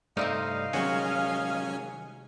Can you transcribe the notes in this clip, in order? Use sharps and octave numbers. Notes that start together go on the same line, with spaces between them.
G2 C3 A3 C4 D#4 D5 D#5 F5
D#3 F#3 G#3 C#4 F#4 G#5